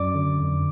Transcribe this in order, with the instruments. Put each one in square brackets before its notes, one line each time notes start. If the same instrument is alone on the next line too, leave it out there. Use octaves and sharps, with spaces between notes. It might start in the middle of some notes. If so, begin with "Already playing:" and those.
Already playing: [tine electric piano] F#2 D5 D6
D3
F2